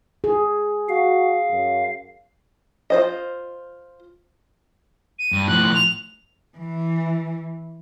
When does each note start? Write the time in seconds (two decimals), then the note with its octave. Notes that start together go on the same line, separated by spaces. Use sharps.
0.24 G#4
0.89 F#4 F5
1.51 F#2
2.90 F4 C5 D#5
5.19 D#7
5.32 G2
5.47 A2 F3 F#6
5.74 F7
6.57 E3